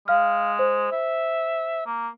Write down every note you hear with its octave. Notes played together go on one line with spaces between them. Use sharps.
G#3 F5 F6
C5
E5
A#3